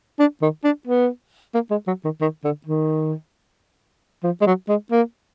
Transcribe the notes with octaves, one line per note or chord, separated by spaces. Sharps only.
D4
D#3
D4
B3
A#3
G#3
F#3
D#3
D#3
D3
D#3
F3
G#3
F#3
G#3
A#3